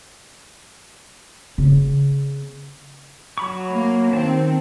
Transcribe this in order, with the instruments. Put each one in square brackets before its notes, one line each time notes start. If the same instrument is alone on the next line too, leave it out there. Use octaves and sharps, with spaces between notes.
[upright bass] C#3 B3
[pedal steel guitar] F#3 B5 C#6
[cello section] A#3
[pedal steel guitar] D#3 A5 [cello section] C4